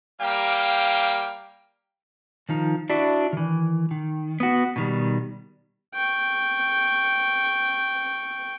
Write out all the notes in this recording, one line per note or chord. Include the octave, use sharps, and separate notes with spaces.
G3 A#3 F5 G5
D#3 F3 D#4
D4 E4 F#4 D5
D#3 E3
D#3
B3 F#4
B2 D#3 G3
G5 C#6